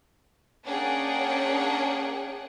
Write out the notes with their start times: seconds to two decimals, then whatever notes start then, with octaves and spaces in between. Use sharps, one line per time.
0.67 A#3 C#4 D4 G#4 F#5 G5